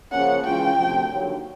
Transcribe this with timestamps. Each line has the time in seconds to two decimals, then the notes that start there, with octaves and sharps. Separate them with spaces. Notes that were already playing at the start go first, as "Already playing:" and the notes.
0.12 C#3 F3 A#3 C#4 F#5
0.44 C#3 E3 G#3 C#4 F4 G5
0.77 D2 C3 F3
1.10 D#2 D3 F#3